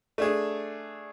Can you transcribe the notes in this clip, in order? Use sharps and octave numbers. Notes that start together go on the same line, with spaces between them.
A3 D4 G#4